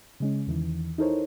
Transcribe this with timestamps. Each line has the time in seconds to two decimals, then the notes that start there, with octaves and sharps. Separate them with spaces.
0.20 C#3 G#3 C#4
0.47 E2 D#3 E3
0.98 D#4 E4 A4 A#4 C5 C#5